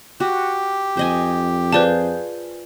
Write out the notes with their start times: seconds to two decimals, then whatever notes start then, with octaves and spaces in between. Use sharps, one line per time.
0.20 F#4 G4
0.97 F2 C5 D#5 G#5
1.73 F4 G#4 B4 C5 D5 A5